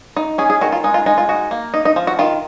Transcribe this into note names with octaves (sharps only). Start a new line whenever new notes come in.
D#4
C#4 G#4
G#4
D#3 F#4
F4
G#3 D#4
F4
G#3 D#4
F4
D#4 F#4
A#3
D#4
D#4
F3
F#4
D#3 F4